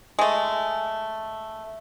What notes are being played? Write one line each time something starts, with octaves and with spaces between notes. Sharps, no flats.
G#3 A3